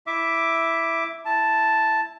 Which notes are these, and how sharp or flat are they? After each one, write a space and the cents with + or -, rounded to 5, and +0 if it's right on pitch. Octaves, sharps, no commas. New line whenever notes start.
E4 +0 E5 +0 D6 +0
E4 +0 A5 +0